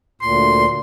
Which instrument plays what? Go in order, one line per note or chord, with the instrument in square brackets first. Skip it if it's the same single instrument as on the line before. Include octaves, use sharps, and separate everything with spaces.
[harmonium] D2 A#2 [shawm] C6